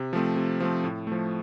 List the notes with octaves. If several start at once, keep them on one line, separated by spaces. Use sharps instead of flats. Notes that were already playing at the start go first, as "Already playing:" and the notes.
Already playing: C3
F3 A3 C4
C3
F3 A3 C4
A2
F3 A3